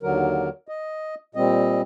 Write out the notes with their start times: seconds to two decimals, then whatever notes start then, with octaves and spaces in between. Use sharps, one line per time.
0.03 D#2 D3 F#3 A#4
0.68 D#5
1.35 A#2 G3 C4 D#5